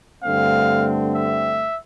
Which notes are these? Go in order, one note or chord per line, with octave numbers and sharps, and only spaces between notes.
G2 D3 A3 C4 F5
E5